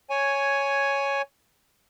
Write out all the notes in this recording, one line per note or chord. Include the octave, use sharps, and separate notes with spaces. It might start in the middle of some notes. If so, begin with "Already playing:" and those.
C#5 G#5